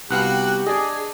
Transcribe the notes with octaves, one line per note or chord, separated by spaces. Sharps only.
C2 B3 F#4 G4 F5 G5 F#6
D4 G#4 D5 D#5